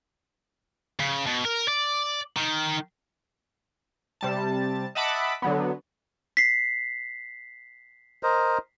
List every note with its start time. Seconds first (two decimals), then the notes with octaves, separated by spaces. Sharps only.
1.00 C#3
1.27 B2
1.45 A#4
1.68 D5
2.37 D#3
4.21 C3 G3 A5
4.95 D#5 E5 F#5 A5 B5 D6
5.42 D3 F#3 B3
6.37 B6 C7
8.23 A#4 C5 D#5